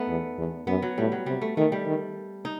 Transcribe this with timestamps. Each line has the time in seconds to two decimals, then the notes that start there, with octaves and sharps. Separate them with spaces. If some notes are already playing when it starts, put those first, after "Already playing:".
Already playing: A3 B3 D#4
0.09 E2
0.38 E2
0.67 F#2 B3
0.82 F#3
0.98 A2 G3
1.12 F#3
1.26 C3 G3
1.42 A3
1.57 D#3 A3
1.72 G3
1.86 D#3
2.45 D#4